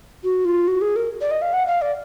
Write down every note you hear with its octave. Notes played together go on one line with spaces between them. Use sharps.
F#4
F4
F#4
G#4
A#4
D5
D#5
F5
F#5
F5
D5